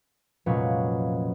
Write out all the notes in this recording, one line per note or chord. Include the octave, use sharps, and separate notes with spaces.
F1 A#2 F#3 G#3 C#4 B4